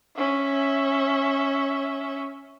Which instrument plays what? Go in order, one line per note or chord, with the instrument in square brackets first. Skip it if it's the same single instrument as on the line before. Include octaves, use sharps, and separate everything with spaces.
[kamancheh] C#4 E5